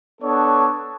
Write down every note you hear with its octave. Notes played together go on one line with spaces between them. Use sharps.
B3 D4 A4 C#5